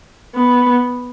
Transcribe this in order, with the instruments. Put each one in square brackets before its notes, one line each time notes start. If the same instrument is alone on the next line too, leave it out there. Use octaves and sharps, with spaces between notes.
[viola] B3